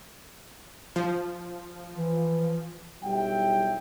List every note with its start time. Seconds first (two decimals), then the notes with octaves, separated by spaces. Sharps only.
0.96 F3
1.95 E3
3.02 B1 G3 E4 G5